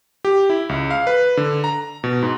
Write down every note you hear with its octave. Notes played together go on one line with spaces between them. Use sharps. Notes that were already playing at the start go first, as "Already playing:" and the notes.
G4
E4
C#2
F5
B4
D3
A#5
B2
G#2